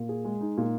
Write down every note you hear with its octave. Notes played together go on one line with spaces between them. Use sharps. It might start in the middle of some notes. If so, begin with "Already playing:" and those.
Already playing: A#2
G#4
G#3
D#4
A#2